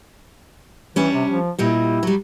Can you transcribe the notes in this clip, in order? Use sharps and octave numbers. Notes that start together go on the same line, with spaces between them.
E3 G3 C#4 D4
C3
F3
A#2 G3 E4 D#5
F#3 G3